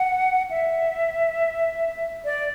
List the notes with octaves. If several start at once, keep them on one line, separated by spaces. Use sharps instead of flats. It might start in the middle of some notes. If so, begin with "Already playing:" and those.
Already playing: F#5
E5
D5